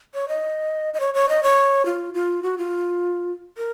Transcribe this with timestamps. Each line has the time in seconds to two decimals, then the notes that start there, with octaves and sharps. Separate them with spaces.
0.14 C#5
0.28 D#5
0.94 D#5
1.00 C#5
1.14 C#5
1.29 D#5
1.43 C#5
1.86 F4
2.14 F4
2.43 F#4
2.58 F4
3.58 A#4